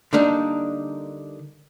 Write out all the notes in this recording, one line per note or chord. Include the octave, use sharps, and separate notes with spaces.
D3 G3 A#3 D4 D#4